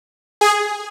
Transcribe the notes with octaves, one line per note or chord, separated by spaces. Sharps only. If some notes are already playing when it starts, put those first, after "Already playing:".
G#4